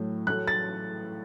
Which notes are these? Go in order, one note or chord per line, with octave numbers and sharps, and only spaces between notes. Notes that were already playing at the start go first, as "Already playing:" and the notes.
Already playing: A2 F#3 A3
A2 F#3 A3 F#6
A6